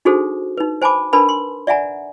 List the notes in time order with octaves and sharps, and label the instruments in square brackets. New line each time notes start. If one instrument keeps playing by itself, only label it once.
[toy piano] D4 D#4 F#4 G#4 A4 C5
D#4 B4
C5 G#5 A5 B5 D6
D4 A#4 B4 A5 B5
C6
D5 E5 F#5 G#5 A#5